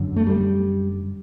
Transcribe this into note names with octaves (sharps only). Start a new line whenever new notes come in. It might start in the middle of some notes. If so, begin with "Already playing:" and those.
Already playing: F#2 D3
A3
G3